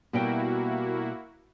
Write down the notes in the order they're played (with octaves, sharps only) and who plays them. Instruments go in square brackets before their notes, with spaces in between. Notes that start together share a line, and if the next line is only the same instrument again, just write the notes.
[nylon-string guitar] B2 G3 G5 [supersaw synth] A#3 E4 F#4